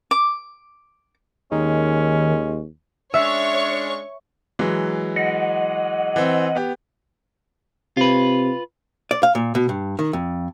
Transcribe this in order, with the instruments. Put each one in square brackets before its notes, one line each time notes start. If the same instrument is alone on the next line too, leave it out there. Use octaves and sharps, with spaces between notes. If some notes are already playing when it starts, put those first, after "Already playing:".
[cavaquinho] D6
[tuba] D#2 [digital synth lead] D#3 [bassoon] G#3 [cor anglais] C#4
[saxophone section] G#3 C#4 D4 [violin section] C#5 C#6 [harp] E5
[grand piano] E3 F#3 G#3
[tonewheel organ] D#5 F#5
[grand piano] E3 C4
B3 G4
[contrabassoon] C3 [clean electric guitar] F4 B4
[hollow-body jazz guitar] D5
F5
A#2
B2
G2
D#3
F2